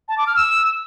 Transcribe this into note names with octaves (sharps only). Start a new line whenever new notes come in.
A5
D6
F6
E6